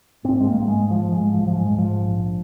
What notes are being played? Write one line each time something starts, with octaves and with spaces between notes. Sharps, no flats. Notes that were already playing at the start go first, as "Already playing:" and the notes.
G#2 C4
G#3
A#3
G#2
A#3
G#3
G#2
F3
G#2 G#3
F3
G#2
F3
G#3
G#2
F3
A#1